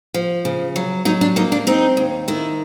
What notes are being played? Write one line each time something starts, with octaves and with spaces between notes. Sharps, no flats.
F3
C#3
F#3
F#3 D#4
D4
A#3 D#4
D4
C4 D#4
D#2
D#3 E4